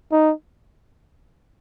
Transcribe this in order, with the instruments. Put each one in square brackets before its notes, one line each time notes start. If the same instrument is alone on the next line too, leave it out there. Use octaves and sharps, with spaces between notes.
[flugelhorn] D#4